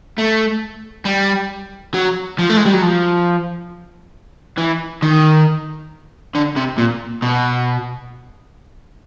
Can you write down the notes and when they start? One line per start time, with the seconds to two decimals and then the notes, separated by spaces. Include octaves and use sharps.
0.18 A3
1.05 G3
1.94 F#3
2.39 F3
2.50 A3
2.57 G#3
2.66 G3
2.74 F#3
2.83 F3
4.58 E3
5.03 D#3
6.35 D3
6.57 C3
6.78 A#2
7.22 B2